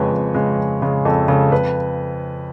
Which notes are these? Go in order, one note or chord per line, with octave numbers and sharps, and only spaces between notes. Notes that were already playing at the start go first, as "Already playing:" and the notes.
Already playing: F2 C#3 G#3 B4 C#5
F2
C#3 G#3
F2
C#3 G#3
F2 A4
C#3 G#3 A4
F2 B4